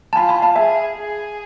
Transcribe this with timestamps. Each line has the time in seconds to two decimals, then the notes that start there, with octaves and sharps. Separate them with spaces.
0.13 A5
0.16 F4 G#5 B5
0.29 G#5 B5
0.42 F5 A5
0.56 G#4 E5 G#5
0.96 G#4